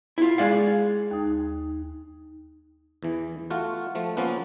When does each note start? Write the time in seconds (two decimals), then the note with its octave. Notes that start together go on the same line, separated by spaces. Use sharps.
0.18 E4 F4
0.38 G#3 D5 F5
1.11 D#2 D#4
3.03 E2 E3
3.50 A3 F4 F#4
3.95 F3 A3
4.17 F3 A#3 B3 C#4 B4